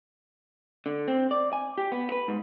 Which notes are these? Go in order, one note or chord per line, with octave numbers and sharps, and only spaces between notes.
D3
C4
D5
G#5
G4
B3
B4
G#2